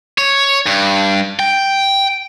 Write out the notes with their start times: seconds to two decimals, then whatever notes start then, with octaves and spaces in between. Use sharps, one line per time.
0.18 C#5
0.66 G2
1.39 G5